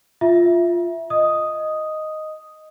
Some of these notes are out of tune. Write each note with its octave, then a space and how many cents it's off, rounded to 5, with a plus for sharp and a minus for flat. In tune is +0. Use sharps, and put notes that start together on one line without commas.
F4 +0 E5 +0
D#5 +0 D#6 +0